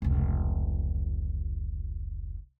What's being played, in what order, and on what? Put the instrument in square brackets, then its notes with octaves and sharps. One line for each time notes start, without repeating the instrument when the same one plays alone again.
[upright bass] F1 C#2